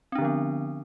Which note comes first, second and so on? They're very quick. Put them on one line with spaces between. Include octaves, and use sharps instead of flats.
C4 D4 D3 F3 B3